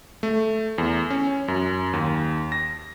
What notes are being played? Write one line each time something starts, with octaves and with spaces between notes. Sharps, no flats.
A3
E2
C#4
F#2
D#2
A#6